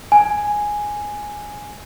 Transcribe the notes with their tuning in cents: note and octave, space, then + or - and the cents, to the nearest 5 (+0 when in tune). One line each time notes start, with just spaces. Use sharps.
G#5 +0